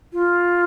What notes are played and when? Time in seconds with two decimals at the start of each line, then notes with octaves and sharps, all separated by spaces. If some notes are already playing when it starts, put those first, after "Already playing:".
0.13 F4